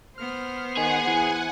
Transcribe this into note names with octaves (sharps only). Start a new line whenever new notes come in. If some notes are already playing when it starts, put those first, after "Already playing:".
B3 C5 F6
D#3 G#4 F#5 G#5
E3